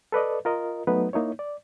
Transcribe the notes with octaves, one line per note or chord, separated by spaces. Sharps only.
A4 B4 D5 D#5
F4 A#4 D#5
F#3 A3 B3 D#4 B4
A#3 D#4 E4 C#5
D5